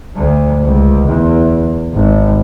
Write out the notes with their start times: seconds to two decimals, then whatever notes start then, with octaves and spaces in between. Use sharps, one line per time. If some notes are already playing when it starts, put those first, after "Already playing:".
0.16 D2
0.62 C#2
1.07 E2
1.94 G#1